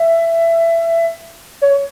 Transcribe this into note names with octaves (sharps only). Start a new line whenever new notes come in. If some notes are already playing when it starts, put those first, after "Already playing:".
Already playing: E5
C#5